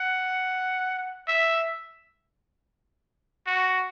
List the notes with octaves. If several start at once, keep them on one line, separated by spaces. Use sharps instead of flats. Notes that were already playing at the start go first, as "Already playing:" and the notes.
Already playing: F#5
E5
F#4